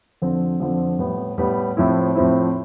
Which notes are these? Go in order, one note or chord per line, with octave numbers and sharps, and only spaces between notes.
F2 D3 F3 C4
F2 D3 F3 C4
A2 G3 B3
A2 G3 B3
A2 F3 C4 E4
A2 F3 C4 E4